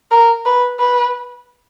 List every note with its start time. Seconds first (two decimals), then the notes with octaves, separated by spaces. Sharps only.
0.11 A#4
0.45 B4
0.80 B4